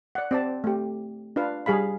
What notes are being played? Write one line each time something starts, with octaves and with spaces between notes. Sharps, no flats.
D5 F#5
C4 D5 A5
A3 G4
D4 F4 B4 F5
G3 G#4 F5 B5